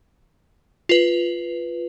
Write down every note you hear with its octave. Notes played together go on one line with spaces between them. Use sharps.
F4 B4